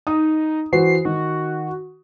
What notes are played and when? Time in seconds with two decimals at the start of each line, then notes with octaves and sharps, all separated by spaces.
0.07 D#4 D#6
0.73 E3 F#4 C5 C7
1.05 D#3 F#4